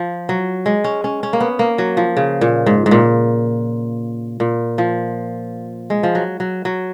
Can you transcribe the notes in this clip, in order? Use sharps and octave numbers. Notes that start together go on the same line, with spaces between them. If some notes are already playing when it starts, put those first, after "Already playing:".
Already playing: F3
F#3
G#3
C#4
C#4
C#4
A#3
B3
A#3
F#3
F3
C#3
A#2
G#2
G#2
A#2
A#2
F3
G#3
F3
F#3
F#3
F#3